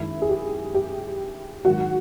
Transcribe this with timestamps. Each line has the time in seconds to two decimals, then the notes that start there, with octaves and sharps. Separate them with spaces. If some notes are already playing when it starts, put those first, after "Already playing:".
Already playing: F#2 D#3 G#3 E4
0.22 G#4
0.29 G4
0.74 G4
1.65 G#2 D#3 F#3 F#4